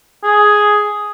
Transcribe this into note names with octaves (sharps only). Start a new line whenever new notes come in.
G#4